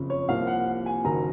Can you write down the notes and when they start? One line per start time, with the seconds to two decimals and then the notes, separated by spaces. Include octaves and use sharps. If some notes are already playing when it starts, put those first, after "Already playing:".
Already playing: F#1 F2 C#3
0.10 C#5
0.28 C2 C3 F3 A#3 F5
0.47 F#5
0.86 G#5
1.04 F#1 F#2 D#3 A#5